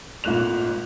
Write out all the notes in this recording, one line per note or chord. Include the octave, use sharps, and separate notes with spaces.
G#1 A#2 A3 F#6 F7